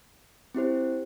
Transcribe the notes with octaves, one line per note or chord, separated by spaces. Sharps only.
C4 E4 G4 C5